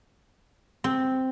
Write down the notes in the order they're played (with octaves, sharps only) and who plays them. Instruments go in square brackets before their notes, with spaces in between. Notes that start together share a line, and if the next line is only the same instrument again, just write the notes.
[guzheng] C4